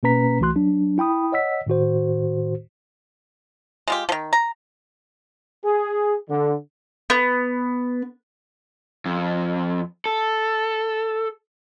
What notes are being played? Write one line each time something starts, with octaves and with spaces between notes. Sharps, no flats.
B2 A#3 C#4 B4 A#5 B6
C2 E3 A3 F#4 C6 F#6
F#3 D4
E4 G5 B5 D#6
C#5 D#5 F#5 E6 B6
A2 D#3 F#4 C5
G#3 F4 G4
D#3 F3
A#5
G#4
D3
B3
F2
A4